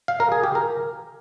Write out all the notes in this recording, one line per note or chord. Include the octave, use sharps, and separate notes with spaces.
F5
A#4
G#4
G4
A#4